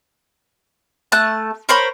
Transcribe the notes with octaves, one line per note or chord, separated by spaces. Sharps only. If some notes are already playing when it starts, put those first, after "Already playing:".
A3 A5 F#6
A#4 C5 C#5 B5